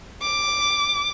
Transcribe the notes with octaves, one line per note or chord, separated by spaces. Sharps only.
D6